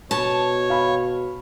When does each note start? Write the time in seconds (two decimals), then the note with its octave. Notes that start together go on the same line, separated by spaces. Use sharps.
0.11 B2 C#5 A5
0.70 F5 B5